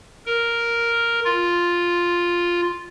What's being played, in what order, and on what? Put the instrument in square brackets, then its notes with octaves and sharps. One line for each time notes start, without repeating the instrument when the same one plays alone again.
[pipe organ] A#4
F4